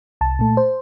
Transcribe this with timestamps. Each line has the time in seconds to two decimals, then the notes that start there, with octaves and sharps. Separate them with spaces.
0.21 C2 A5
0.39 A#2 A3
0.57 C5